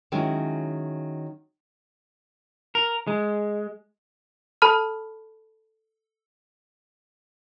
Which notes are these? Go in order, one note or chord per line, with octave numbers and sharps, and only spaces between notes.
D#3 F#3 G#3 C#4 E4
A#4
G#3
A4 A5 B5 F6